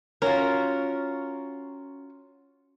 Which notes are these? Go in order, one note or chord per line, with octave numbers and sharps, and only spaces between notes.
C#4 F4 F#4 A#4